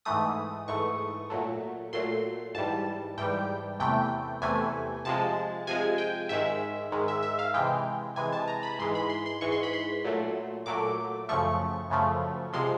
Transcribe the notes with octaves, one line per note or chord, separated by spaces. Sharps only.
G#2 E3 A3 D#6
G#2 E3 A3 C#6
A#2 F#3 A3
A#2 F#3 A3 C6
G#2 E3 G3 A5
G#2 E3 G3 G5
E2 C3 E3 A3 G5
E2 C3 E3 A3 G#5
C3 F3 G#3 A5
C3 F3 G#3 G#5
G5
G#2 D#3 G#3 E5
G#2 D#3 G#3
E5
E5
F5
C3 E3 G#3 G5
C3 E3 G#3 G#5
A5
A#5
B5
G#2 E3 G#3 C6
B5
C6
C6
G#2 E3 G#3 C#6
C6
B5
C6
A#2 F#3 A3
A#2 F#3 A3 D6
F#2 C#3 F3 A3 C#6
F#2 C#3 F3 A3
C3 F3 G#3 C6